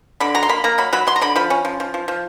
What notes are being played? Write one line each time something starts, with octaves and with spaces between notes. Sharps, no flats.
D3 B5
F#3 A#5
C6
A#3 B5
A#3 A#5
F#3 B5
F#3 B5
F#3 C6
A#5
D3 B5
F3 B5
C#4
F3
F3
F3
F3